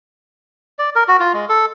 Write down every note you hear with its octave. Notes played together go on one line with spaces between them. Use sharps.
D5
A#4
F#4
F4
G#3
A4